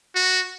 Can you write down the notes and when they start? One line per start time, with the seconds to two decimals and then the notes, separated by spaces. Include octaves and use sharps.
0.16 F#4